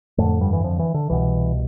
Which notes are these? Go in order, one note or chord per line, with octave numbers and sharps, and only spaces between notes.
F2 A2 D3 A3
G2 G3
E3
F2 F3
E3
D3
C2 B2 E3